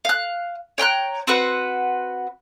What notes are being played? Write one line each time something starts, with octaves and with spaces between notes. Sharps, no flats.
F5 F#6
C#5 G5 A#5 F#6
C4 F#4 B4 F#5